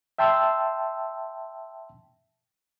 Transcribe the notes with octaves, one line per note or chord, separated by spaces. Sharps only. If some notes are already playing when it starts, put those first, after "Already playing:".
E5 G5 A5 C6 E6